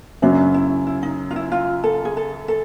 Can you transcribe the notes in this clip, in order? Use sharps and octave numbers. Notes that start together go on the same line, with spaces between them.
F#2 C#3 F#3 D4
E4
E4
D#4
F4
E4
F4
A4
G#4
A4
A4